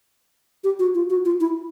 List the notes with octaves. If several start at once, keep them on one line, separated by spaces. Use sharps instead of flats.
G4
F#4
F4
F#4
F4
E4